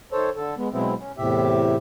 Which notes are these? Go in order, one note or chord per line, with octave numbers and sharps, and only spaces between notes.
D#3 A4 C5 C#5
D3 A4
G#3 B3
B2 F#3 G#3 B3 C4 E4
C#4
E2 A2 C3 G4 E5